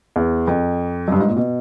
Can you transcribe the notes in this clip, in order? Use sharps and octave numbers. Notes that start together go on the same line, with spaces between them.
E2
F2
F#2
G2
G#2
A#2
B2